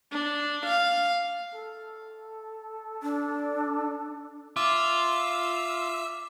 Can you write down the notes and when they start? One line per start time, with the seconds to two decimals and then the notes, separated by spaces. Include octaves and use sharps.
0.12 D4
0.66 F5
1.55 A4
3.03 D4
4.56 F4 E5 D6 E6